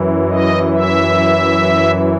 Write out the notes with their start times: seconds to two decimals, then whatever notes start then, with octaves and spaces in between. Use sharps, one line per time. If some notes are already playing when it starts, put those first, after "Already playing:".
Already playing: F#2 E3
0.29 D#5
0.72 E5